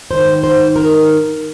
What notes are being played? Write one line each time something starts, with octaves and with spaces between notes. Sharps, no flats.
G#2 D#3 C5
C5
A#4